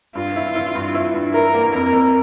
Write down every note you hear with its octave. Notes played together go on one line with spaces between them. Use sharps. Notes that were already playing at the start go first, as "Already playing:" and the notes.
G2 F4
E4
E4
G2
E4
G2
E4 A#4
A#3
F2 A#4
F2